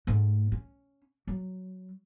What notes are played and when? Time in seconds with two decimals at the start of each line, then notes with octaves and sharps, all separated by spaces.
0.07 G#2 A3
0.52 C#4
1.27 F#3